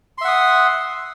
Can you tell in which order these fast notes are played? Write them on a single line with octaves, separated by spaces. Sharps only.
C6 E5 F#5 D#6